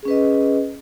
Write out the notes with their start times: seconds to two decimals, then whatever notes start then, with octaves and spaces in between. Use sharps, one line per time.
0.03 G#4
0.05 C#4
0.08 B4
0.11 D#5